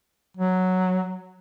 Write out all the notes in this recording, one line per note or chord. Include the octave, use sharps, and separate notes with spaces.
F#3